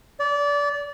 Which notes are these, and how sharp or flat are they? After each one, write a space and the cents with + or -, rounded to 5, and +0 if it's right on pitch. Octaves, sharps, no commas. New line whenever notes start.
D5 -25